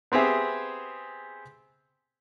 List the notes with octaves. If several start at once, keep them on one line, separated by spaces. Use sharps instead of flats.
B3 C4 G4 G#4 E5